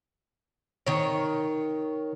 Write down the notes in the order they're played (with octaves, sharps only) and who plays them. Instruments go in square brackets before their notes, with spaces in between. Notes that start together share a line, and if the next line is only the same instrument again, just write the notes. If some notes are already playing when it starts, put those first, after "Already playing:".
[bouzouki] D#3 C#5